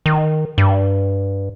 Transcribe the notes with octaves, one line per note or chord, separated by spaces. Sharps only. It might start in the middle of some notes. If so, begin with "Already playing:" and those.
D#3
G2